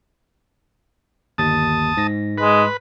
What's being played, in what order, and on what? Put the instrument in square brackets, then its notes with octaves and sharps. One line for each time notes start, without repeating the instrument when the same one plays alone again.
[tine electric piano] G1 D#2 A6 [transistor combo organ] A5 D#6
[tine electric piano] G#2 A#6
[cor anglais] G#3 [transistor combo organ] B4